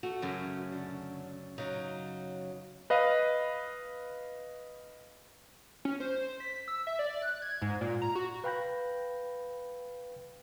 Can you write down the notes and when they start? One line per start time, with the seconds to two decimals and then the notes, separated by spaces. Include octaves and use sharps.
0.03 A3 F#4
0.22 F#2 C#3
0.72 D3
1.58 C#3 F#3 D#4
2.90 B4 D#5 F5
5.85 C#4
6.00 C5
6.40 B6
6.68 E6
6.87 E5
6.99 D5
7.22 F#6
7.42 G#6
7.62 G#2
7.81 A#2
8.02 A#5
8.15 F#4
8.44 B4 F5 G5 B5 G6 A#6